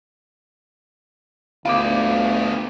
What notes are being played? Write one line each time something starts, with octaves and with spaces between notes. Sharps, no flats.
D2 B3 F4 F5 D6